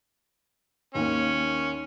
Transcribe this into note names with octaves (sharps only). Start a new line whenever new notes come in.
D#2 A#3 C#4